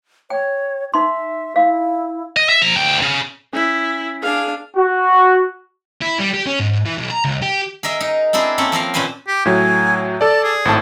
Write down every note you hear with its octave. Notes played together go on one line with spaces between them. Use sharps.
C#5 G5
D#4 E5 C6
E4 F5
D#5
E5
F3 A#5
D2 G5
C#3
C#4 E4 B6
D4 G#4 F5
F#4
E4
G3
G4
C#4
G#2
E3
B1
A#5
C#2
G4
G#4 A#4 D#5 E5
D#4
C4 D4 E4 G#4 A#4
A#3 C4 C#4 A4
F3 C4 A#4 F5
A#2 A#3 C#4 B4 C5 G#5
G4
A2 F#3 G#5
A4 D5 A5
G#4
G#1 A2 A5